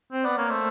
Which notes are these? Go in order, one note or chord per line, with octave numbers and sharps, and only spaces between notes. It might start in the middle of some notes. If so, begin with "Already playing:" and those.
C4
B3 D5
A#3 C#5
A3 C5